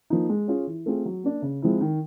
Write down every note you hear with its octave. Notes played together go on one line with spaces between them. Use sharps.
F3 A#3 D#4
G#3
C#4 F4 G#4
E3
A3 C4 F4 G#4
F#3
A#3 D4
C#3
F3 G#3 C4 E4
D#3